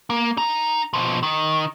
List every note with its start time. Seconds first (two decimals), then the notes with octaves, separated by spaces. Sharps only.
0.10 A#3
0.37 D#4 A#5
0.93 B2 F3
1.23 D#3